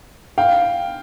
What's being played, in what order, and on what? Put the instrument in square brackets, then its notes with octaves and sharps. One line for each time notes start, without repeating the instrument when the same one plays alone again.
[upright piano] F5 G5